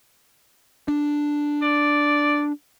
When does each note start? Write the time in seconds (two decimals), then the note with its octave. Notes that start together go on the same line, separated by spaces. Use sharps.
0.88 D4
1.62 D5